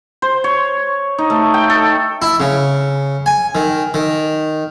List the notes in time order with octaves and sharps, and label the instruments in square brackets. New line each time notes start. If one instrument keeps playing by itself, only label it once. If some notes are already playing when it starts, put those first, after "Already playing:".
[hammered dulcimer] C5
C#5
D#4
A3
G5
A4
[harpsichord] E4
C#3
G#5
D#3
D#3